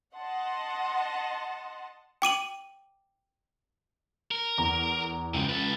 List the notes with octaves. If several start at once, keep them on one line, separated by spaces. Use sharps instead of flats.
D#5 F#5 A5 C6
G5 D6 D#7 F#7
A#4
E2 A#5
C#2 E3 C4
A4 B4